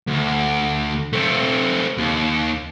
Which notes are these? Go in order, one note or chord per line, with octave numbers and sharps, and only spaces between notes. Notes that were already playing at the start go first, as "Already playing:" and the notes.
D2
A3 C4
D#2